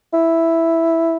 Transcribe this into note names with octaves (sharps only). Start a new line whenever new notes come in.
E4